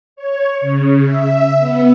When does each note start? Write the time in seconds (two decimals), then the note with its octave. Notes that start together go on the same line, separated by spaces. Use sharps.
0.16 C#5
0.61 C#3
1.05 E5
1.58 B3